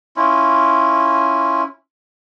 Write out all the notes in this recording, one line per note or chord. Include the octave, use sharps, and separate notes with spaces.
C#4 E4 F4